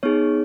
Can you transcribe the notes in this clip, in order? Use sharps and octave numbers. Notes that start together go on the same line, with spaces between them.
B3 D#4 G#4 C#5